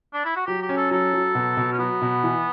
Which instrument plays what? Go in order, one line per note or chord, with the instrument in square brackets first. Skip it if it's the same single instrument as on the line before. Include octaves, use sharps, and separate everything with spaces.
[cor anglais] D4
E4
F#4
[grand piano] F#3 [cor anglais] G4
[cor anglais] G4
[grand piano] C#4
[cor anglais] A4
[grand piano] F#3 [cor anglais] A4
[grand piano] F#3
B2
B2
[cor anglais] C#4
[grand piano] F#3 [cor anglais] B3
[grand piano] B2
E3